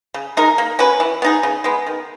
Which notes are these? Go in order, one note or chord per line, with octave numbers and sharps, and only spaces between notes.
C#3
G#3 D#4 A#4
A#3
C#4 F#4 B4
E3
B3 D#4 G#4
C#3
G#3 B3
D#3